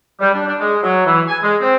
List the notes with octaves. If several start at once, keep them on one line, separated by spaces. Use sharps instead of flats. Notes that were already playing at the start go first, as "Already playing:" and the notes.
G3
D4
D4
G#3
F#3
E3
G#5
G#3
C4